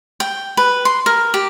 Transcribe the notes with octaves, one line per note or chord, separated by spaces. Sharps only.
G5
B4
C6
A#4
G4